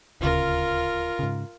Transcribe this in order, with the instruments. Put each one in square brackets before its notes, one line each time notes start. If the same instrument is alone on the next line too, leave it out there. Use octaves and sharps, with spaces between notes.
[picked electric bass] D#1 D2 C#3 [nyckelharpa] F4 A#4
[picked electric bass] G#2 C#3